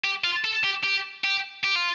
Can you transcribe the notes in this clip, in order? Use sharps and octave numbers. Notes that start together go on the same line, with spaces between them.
G4
F4
A4
G4
G4
G4
G4
F4